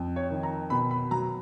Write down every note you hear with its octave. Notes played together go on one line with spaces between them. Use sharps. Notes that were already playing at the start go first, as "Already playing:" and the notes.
Already playing: F2
C#5
D#3
A#5
B2 B5
B5
F#3 A#5